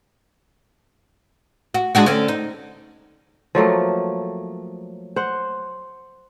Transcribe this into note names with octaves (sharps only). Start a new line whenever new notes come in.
F#4
G#3 D4 F#4
D3 C4 C#4
D#4
F3 F#3 A3 A#3
C5 F#5